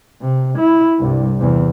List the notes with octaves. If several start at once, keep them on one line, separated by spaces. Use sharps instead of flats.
C3
E4
C2 G2
E2 C3